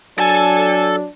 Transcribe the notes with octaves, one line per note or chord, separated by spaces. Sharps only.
F#3 D4 A4 G#5 A5